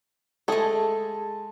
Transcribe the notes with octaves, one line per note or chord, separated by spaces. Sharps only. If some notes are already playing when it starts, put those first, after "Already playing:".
G#3 A3 G#4 A4